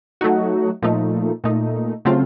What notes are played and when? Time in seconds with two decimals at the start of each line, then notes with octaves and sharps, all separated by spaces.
0.21 F#3 A3 D#4 F#4
0.82 A#2 F3 A3 D#4
1.44 A#2 A3 D#4
2.05 C#3 F#3 A3 C4 F4